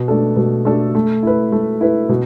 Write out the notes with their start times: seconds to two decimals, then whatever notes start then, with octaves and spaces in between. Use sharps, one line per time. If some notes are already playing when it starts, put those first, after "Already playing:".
Already playing: B2
0.08 A3 D4 A4
0.36 B2
0.65 A3 D4 A4
0.95 A3
1.23 E4 B4
1.52 A3
1.81 E4 B4
2.09 B2